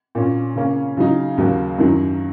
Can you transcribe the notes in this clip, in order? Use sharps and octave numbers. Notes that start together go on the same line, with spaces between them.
A#2 A#3 C#4
C#3 A#3 C#4
C#3 F#3 D#4
D#2 C#3 F#3 A#3
F#2 D#3 F#3